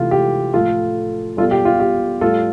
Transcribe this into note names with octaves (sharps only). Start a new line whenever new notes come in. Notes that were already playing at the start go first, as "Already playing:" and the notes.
Already playing: C3 E3 A3 F4
G4
A2 F3 A3 F4 A4
G3 F4 A4
B2
G4
F4
G4
A2 G3 F4 A4